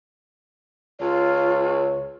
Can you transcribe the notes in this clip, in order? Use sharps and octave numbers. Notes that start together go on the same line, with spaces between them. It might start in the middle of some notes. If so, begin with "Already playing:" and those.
C#2 F4 C#5